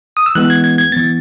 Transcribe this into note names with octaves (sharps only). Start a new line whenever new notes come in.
D#6
E6
E3 G#3 B3 F#6
G#6
G#6
G#6
E3 B3 A6